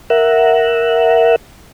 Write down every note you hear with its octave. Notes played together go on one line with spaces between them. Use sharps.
A#4 E5 F#5